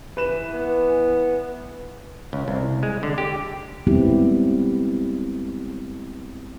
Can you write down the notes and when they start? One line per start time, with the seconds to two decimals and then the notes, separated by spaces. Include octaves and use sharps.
0.17 E3 B4 E7
0.53 B3
2.33 C#2
2.48 C2
2.83 G#3
3.03 D3
3.18 G4
3.87 G3 G#3 B3 C4 E4 G4